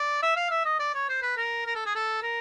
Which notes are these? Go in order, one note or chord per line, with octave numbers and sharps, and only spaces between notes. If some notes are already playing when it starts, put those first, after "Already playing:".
Already playing: D5
E5
F5
E5
D#5
D5
C#5
C5
B4
A#4
A#4
A4
G#4
A4
A#4